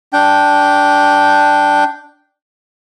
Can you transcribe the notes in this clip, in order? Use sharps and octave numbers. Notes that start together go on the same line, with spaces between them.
D4 G5